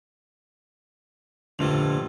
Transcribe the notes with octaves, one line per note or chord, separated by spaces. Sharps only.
F1 G2 A#2 D3 F3 A3 F7